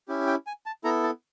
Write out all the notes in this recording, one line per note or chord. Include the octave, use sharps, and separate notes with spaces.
C#4 E4 G4
G5
G#5
A5
B3 E4 A4 A#5
A5